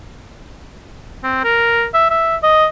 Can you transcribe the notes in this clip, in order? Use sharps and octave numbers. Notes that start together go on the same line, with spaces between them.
C4
A#4
E5
E5
D#5